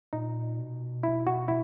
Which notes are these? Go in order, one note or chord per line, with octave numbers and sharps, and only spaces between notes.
A#2 D#4
B2
E4
F#4
E4